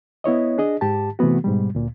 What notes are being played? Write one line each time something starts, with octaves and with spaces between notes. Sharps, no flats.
B3 E4 C#5 D#5
D4 G#4 D#5
G#2 G4 A5
C3 E3 A3 B3 F#4
G#2 B2 G3
D2 A#2